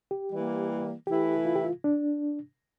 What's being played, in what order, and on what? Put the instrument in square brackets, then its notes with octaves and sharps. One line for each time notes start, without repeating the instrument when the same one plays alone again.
[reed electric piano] G4
[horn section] E3 G3 A#3
[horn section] E3 A3 E4 [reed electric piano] G4
[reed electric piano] F4
G4
F4
D4